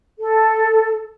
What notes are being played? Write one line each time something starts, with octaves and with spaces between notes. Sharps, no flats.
A4